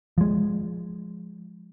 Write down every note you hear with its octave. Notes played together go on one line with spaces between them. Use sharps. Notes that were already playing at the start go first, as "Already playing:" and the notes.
F3 G#3